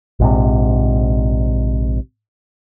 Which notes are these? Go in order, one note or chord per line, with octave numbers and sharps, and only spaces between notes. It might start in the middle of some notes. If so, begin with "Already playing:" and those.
A#1 G#2 C3